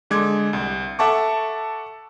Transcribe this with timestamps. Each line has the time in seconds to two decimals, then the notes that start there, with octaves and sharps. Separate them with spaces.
0.10 D3 G#3 D6 G#6
0.53 C2
0.99 A4 E5 F#5 A5 C#6 D6